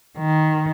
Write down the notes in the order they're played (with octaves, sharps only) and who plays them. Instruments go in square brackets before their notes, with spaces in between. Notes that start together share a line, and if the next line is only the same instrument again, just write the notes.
[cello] D#3